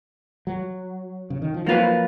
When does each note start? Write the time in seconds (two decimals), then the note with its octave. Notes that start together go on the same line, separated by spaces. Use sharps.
0.47 F#3
1.30 C#3
1.42 D#3
1.54 F3
1.66 F3 F#3 A#3 F4 B4